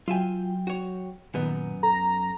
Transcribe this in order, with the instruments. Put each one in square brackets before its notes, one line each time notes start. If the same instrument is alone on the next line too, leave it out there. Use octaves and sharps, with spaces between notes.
[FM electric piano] F#3 G5 [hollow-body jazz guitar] F4 E5 G#5
[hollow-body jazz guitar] F#4 C#5
[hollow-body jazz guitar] F#2 B3 D#4 [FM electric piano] A#2 D#3
[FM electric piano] A4 [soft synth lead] A#5